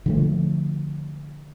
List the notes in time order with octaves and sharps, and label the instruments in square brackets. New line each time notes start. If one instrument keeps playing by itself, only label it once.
[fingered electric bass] D3 F3 A3